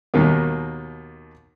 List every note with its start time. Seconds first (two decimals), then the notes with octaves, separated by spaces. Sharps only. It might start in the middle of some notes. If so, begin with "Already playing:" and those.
0.14 D#2 B2 D#3 A#3